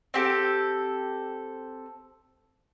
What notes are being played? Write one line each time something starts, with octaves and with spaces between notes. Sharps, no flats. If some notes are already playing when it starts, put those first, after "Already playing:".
C4 G4 A4